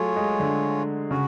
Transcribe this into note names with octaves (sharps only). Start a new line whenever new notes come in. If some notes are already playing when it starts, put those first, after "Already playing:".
Already playing: F#3 A3 F4 G#4 C#5
G#3
D3
C#3 F#4